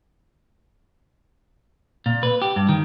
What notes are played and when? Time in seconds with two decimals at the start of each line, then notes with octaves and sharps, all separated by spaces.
2.06 A#2
2.23 B4
2.42 G4
2.56 G2
2.69 D#3